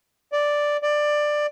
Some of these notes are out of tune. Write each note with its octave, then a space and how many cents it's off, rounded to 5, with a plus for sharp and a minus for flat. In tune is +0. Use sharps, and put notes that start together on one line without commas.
D5 +0
D5 +15